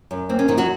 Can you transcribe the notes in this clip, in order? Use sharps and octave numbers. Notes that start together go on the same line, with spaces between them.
F#2
A#3 C4
C#4
F#2 D#3 D#4
F#3 F#4